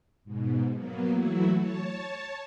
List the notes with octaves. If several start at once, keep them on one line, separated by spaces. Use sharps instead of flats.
G#2 B2
F#3 A#3 B3
E3 F#3 A3 E4 F#4
C#5 A5